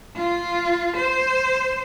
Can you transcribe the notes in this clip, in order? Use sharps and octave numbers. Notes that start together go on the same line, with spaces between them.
F4
C5